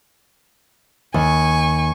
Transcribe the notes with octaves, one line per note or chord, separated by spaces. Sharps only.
D#2 G#5 C#6